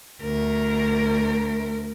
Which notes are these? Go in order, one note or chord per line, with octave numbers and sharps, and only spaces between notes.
D2 A#4